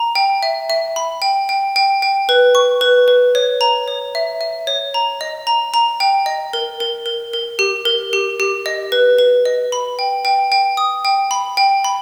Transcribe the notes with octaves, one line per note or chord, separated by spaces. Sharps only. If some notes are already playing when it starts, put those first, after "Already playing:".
Already playing: A#5
G5
E5
E5
B5
G5
G5
G5
G5
B4
C#6
B4
B4
C#5
A#5
C#5
E5
E5
C#5
A#5
D#5
A#5
A#5
G5
D#5
A#4
A#4
A#4
A#4
G4
A#4
G4
G4
D#5
B4
B4
D#5
B5
G5
G5
G5
D#6
G5
B5
G5
B5